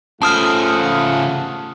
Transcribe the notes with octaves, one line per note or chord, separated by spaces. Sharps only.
C#3 A3 F4 C5 F#5 A5 D#6 F6